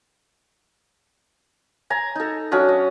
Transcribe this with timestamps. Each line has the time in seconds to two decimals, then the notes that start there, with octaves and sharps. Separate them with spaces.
1.90 G#5 A#5
2.15 D#4 A4
2.51 F#3 C#4 D4 D#5
2.69 D#5